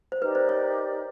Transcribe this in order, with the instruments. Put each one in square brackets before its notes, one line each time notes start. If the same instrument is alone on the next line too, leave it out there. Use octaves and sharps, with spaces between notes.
[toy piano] C5
[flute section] D#4 G4 A#4 D5 [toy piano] B4
[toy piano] C5
C#5